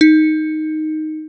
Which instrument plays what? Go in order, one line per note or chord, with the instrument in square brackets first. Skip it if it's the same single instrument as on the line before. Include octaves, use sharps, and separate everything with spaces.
[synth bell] D#4